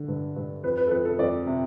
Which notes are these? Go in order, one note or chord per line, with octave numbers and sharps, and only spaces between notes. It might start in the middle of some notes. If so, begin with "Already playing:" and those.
Already playing: D3
G2
G2
F2 B4
B4
A4
F2 B4
A4
F2 D5
C3